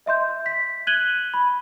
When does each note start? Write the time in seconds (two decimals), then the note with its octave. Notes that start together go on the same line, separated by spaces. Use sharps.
0.06 D#5 E5 C6 G6
0.46 B6
0.87 F#6 G#6 D#7 F#7 G7
1.34 B5